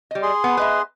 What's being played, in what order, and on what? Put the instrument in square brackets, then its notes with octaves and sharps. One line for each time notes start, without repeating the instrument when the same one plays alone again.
[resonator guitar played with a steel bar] G3 D#5
[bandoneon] G#4 C6
[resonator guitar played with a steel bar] B3
B4 D#5 E5